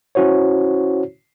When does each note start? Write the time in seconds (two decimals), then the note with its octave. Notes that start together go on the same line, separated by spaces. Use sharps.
0.15 C#4 E4 F#4 C5 C#5